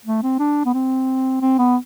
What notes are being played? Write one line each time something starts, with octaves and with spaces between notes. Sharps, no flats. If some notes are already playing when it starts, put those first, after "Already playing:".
A3
C4
D4
B3
C4
C4
B3